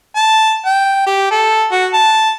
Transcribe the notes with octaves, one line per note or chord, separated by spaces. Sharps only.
A5
G5
G4
A4
F#4
A5